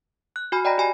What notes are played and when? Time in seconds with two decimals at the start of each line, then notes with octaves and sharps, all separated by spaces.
0.36 F#6
0.52 F#4 G#5 B5 F6
0.65 D5 D#5 G5 A#5 B5 A#6
0.78 G4 G#5 B5